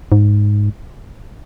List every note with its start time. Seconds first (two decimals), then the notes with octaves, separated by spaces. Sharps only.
0.12 G#2